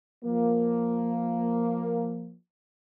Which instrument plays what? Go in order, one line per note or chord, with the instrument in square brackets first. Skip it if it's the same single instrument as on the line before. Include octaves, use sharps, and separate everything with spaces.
[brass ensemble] F3 A#3